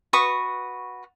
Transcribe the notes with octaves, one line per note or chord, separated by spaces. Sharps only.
F#4 B4 C#6 D#6